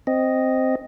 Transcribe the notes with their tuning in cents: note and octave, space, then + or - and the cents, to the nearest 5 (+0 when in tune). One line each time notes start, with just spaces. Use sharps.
C4 +0 D#5 +0